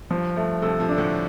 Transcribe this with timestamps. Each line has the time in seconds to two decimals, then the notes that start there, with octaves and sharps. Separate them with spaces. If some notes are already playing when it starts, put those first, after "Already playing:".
0.10 G2 F3
0.36 G2 A3
0.62 G2 C3 A4
0.80 C3 F3
0.89 D4
0.98 A2 D3